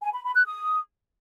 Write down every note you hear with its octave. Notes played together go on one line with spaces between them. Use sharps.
G#5
B5
B5
F#6
D#6